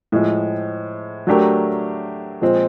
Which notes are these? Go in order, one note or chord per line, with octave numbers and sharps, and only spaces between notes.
A2 F3 G#3
F#3 A3 D4 G4 A#4
A#2 F3 G#3 C4